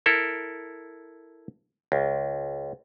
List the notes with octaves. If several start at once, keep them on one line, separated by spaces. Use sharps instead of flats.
E4 A4 A#4
C#2